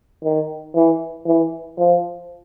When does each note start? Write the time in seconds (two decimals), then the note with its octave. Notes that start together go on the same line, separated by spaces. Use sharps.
0.24 D#3
0.75 E3
1.26 E3
1.78 F3